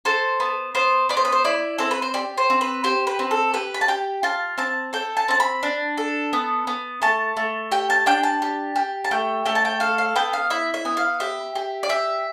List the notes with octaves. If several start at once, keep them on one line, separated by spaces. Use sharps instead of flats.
A4 C5
B3
B3 C5
B3 D5
C5
B4
C5
E4 D5
C4 A4
B4
C5
G4 D5
C5
C4
B4
G4 C5
B4
C4
A4
G4 B4
B5
A5
G4 G5
F4 A5
C4 A5
A4 G5
A5
C4 A5
B5
D4
A4
B3
B3
A3 A5
A3
G4 G5
A5
D4 G5
A5
G4
G4
A5
A3 G5
A3 G5
A5
G5
A4 F5
F5
B3 G5
F5
E4 E5
E5
B3
F5
G4 E5
G4
D5
G4 E5